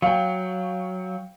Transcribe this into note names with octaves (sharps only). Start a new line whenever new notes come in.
F#3 F5 G5